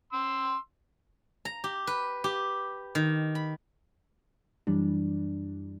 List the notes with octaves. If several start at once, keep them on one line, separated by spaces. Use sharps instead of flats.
C6 E6
A#5
G4
B4
G4
D#3
B5
F#2 E3 G3 D4